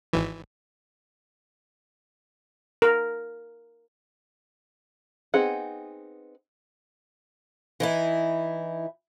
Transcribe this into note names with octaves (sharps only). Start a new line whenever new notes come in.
G#1 E3
A#4
B3 C4 D#4 G#4 F#5
E3 D#4 E4